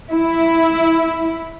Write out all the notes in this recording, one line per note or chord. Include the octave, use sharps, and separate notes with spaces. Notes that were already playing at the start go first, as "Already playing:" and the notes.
E4